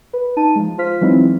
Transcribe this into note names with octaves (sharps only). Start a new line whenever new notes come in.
B4
D#4 A5 D#7
F3 G#3
F4 C5 F6 B6
E3 F#3 G#3 C4 D#4 E4